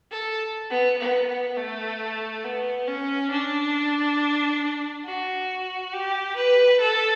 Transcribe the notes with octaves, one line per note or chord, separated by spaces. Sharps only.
A4
B3
B3
B3
A3
B3
C#4
D4
F#4
G4
B4
A4